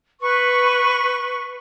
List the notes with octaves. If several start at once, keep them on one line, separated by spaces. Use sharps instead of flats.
B4 C#6